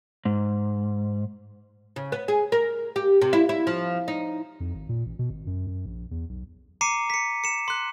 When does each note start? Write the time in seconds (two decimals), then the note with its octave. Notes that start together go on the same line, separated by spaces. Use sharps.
0.25 G#2
1.96 C#3
2.12 B3
2.28 G#4
2.52 A#4
2.96 G4
3.22 C3
3.33 E4
3.49 E4
3.67 F3
4.08 D#4
4.60 F2
4.74 G#1
4.89 A#2
5.06 A1
5.19 B2
5.30 G#1
5.47 F#2
5.67 F#2
5.86 A#1
6.11 E2
6.29 B1
6.81 A#5 D6 C7 C#7 D#7
7.10 B6 C#7
7.44 C#7 E7
7.68 C6 F#6